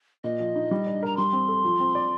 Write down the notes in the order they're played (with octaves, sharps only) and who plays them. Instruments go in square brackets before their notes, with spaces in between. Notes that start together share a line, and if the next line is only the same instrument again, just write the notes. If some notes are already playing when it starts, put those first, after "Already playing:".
[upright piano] A#2 [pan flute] D#5
[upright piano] F3
D#4
G3
D4
[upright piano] A#4 [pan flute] A#5
[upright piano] G3 [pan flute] C6
[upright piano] C4
A4
F3
C4
D5